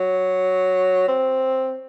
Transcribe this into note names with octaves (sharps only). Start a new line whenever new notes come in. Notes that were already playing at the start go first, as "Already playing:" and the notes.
Already playing: F#3
C4